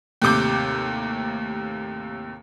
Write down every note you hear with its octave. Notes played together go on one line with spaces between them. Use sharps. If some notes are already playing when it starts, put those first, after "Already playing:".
D#2 A2 C3 D6 G6